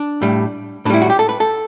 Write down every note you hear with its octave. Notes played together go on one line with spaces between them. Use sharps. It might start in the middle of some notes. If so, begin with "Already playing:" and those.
Already playing: D4
A2 G3
A2 G3 D4 E4
F#4
G4
A4
B4
A4